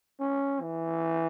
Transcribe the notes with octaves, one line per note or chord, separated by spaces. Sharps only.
C#4
E3